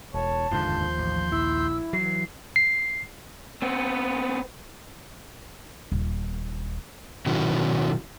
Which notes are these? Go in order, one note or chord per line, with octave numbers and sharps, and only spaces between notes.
E1 C#5 A5
F1 D#2 G#2 D3 F3 C6 G6
A1
A#1 E4 E6
E3 F#3 C7
C7
B3 C4
D#1
B2 D#3 F#3 C#4 E4 F#4